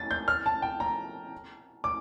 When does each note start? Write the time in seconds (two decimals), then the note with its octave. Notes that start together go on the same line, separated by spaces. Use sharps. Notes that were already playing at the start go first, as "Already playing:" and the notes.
Already playing: A6
0.11 G6
0.28 F6
0.46 A5
0.62 G5
0.80 A#5
1.84 D6